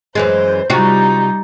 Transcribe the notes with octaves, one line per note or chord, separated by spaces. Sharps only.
F#2 E3 G#3 C5
C3 G3 D#4 F4 F#4